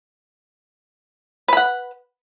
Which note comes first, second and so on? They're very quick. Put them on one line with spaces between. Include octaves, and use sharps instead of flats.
B4 B5 F#5